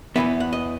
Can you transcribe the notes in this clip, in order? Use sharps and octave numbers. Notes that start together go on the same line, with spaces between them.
E2 C3 E3 B3 E5
F#5
D#5